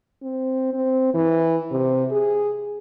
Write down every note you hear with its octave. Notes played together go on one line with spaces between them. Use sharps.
C4
C4
E3
C3
G#4